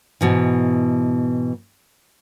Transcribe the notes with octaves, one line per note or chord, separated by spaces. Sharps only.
G#2 B2 E3